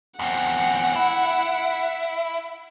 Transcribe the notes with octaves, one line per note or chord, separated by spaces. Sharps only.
E2 C4 F#5
E4